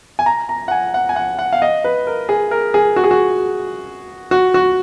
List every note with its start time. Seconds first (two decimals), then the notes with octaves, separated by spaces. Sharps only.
0.19 G#5
0.26 A#5
0.49 A#5
0.68 F#5
0.71 G#5
0.94 F#5
1.09 G#5
1.16 F#5
1.39 F#5
1.53 F5
1.62 D#5
1.84 B4
2.07 A#4
2.29 G#4
2.51 A#4
2.74 G#4
2.96 F#4
3.04 G#4
3.11 F#4
4.31 F#4
4.54 F#4